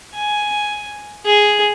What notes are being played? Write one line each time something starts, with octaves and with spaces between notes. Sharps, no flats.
G#5
G#4